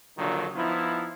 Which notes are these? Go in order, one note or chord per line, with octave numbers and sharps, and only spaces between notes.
A#1 D3 D#3 F#3 F4
F3 B3 D#4 E4